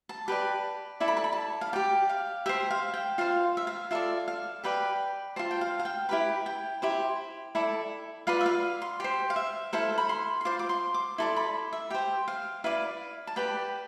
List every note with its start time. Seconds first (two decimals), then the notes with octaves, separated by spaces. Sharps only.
0.09 A5
0.28 G4 B4 D5
1.00 E4 A4 D5 A5
1.08 B5
1.17 A5
1.24 B5
1.33 A5
1.61 F5
1.73 G4 D5 G5
2.09 F5
2.46 G4 C5 E5
2.71 F5
2.94 G5
3.18 F4 C5 F5
3.57 E5
3.67 F5
3.91 F4 A4 D5 E5
4.28 F5
4.64 G4 B4 D5 G5
5.36 F4 C5 A5
5.51 G5
5.61 F5
5.79 F5
5.85 G5
6.09 E4 G4 B4 B5
6.46 G5
6.82 E4 G4 C5
7.55 E4 A4 D5
8.27 F4 B4 D5 F5
8.41 E5
8.46 F5
8.82 C6
9.00 G4 C5 C6
9.30 F5
9.36 E5
9.73 E4 A4 C5 F5
9.98 B5
10.09 C6
10.41 C6
10.45 F4 C5 D6
10.59 D6
10.69 C6
10.94 D6
11.18 E4 A4 D5 C6
11.36 B5
11.73 E5
11.90 G4 C5 G5
12.28 F5
12.64 E4 B4 D5 F5
13.27 A5
13.36 G4 B4 D5 G5